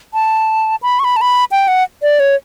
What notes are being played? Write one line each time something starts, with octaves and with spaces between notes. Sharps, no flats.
A5
B5
C#6
B5
A5
B5
G5
F#5
D5
C#5